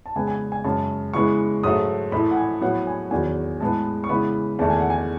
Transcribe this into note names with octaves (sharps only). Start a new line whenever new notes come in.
A5
C#3 G#3 B3 G#5
G#5
G#5
F#2 C#3 G#3 A5
C#3 E3 G#3 B3 C#6
G#2 F#3 A3 D#6
A2 E3 A3 B5
F#5
G#5
A2 F#3 B3 F#5
G#5
E2 D#3 F#3 B3 G#5
A2 G#3 B3 A5
C#6
C#3 E3 G#3 B3 B5
E2 D#3 A3 A5
G#5
F#5
G#5